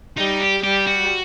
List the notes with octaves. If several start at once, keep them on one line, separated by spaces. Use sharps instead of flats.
G3 D#4
G4
G3 G4
F#4